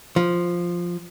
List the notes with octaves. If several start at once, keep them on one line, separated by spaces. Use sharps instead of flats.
F3